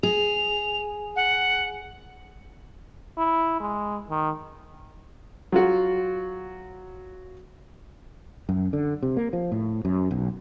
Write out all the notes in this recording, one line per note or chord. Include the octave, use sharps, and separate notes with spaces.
G#4 F7
F#5
E4
G#3
D#3
F#3 F4 F#4
F#2
D3
C3
A#3
F3
A2
F#2
B1